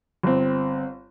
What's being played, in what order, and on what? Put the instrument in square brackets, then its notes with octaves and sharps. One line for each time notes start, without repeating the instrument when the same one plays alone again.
[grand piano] G1 C4